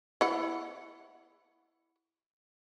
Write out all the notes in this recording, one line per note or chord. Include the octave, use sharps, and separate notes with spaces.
E4 F#5